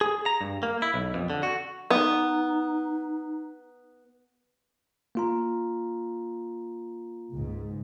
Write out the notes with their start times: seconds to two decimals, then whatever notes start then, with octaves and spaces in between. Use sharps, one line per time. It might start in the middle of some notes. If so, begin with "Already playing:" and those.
0.01 G#4
0.26 A#5
0.41 G2
0.63 A#3
0.82 E4
0.94 B1
1.15 F2
1.30 D3
1.43 F#4
1.90 B3 D#4
5.15 A#3 F4 A#5
7.32 C#2 G#2